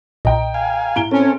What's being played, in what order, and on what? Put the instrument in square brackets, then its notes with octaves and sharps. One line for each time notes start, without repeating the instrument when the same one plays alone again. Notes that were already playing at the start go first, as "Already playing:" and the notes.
[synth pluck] B1 A#2 [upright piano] D#5 G5 A#5
[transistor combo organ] F5 G#5
[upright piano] A2 D7 G7 [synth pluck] A#5
[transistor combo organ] C4 A4 [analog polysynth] C#4